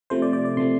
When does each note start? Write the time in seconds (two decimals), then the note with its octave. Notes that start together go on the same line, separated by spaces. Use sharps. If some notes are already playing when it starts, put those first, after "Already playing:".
0.10 C3 F3 A3 C5
0.22 D5
0.33 D5
0.45 D5
0.57 C3 F3 A3 C6